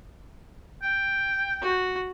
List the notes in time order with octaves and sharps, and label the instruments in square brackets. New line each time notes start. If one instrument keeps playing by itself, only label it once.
[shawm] G5
[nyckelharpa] F#4